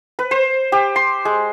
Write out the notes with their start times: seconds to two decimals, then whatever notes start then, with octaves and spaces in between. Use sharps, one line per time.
0.19 B4
0.31 C5
0.72 G4
0.96 C6
1.25 G#3